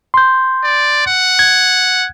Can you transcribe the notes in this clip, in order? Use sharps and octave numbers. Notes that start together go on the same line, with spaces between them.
C6 G6
D5
F#5
G#6